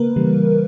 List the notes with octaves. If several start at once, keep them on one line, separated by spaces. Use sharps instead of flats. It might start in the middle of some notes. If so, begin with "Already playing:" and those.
Already playing: C#3 A#3 A#4 B4
C#3 E3 G3